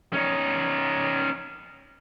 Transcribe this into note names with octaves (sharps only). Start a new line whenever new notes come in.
C#4 D#4